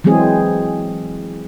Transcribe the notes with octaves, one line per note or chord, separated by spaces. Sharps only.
E3 F#3 G#3 C4 G#4